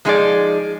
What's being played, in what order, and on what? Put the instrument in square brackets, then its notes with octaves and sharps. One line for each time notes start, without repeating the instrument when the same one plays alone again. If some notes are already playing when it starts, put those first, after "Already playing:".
[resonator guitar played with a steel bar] F3 G#3 D#4 G#4 D5